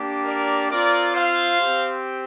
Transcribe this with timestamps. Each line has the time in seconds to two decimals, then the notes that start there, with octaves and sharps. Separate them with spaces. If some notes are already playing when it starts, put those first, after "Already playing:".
Already playing: A#3 D4 G4
0.25 A#4 D5
0.70 C4 F4 A#4 D5
1.14 C5 F5
1.60 C4 G4